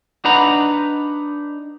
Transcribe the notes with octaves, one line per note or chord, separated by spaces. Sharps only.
D4 D#4 B4 F#5 A#5 B5